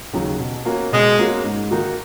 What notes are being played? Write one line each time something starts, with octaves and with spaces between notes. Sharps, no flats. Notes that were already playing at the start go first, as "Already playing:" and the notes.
D#2 C#3 F#3
B2
A#3 C#4 F#4
B2 G#3
A#3 C#4 F#4
G#2
D#3 A#3 D#4 F#4